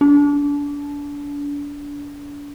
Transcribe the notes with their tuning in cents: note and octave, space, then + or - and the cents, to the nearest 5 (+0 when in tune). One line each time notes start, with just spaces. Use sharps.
D4 -30